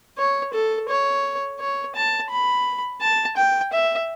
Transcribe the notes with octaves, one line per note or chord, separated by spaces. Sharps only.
C#5
A4
C#5
C#5
A5
B5
A5
G5
E5